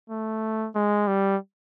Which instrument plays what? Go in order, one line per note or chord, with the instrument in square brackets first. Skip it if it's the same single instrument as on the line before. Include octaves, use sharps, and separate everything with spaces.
[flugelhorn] A3
G#3
G3